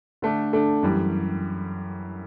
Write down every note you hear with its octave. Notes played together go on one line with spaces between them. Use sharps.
D3 A3 D4
D3 A3 D4
F#2 E3 G3